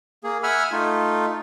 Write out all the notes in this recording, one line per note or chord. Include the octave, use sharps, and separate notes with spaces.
A#3 G#4
E5 F#5 G#5 B5 E6 F6
A3 D#4 F4